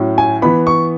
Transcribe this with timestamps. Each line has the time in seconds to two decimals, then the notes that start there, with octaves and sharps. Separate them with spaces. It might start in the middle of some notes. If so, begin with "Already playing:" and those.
Already playing: A2 F#3 C#4
0.18 G#5
0.42 E3 B3 B5
0.67 C#6